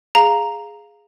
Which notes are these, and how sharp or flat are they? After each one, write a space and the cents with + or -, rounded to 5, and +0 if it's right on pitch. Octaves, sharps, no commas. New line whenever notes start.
G#4 +0 F5 +0 A#5 +0